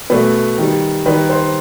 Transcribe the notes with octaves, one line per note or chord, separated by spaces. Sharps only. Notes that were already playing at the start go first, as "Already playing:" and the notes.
B2 A3 B4
D#3 G3
D#3 G3 B4
C5